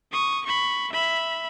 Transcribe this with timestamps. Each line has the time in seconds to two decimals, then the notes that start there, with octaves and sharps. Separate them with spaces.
0.12 C#6 D#6
0.46 B5 C#6
0.92 E5 B5